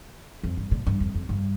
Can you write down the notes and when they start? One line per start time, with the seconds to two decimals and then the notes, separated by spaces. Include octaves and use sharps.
0.43 F2
0.57 G2
0.71 A#2
0.87 G2
1.00 F2
1.15 F2
1.29 G2